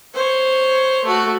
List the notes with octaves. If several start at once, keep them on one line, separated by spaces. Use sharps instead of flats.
C5 C#5
A3 F#4